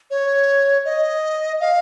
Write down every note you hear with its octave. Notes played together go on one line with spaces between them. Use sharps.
C#5
D#5
F5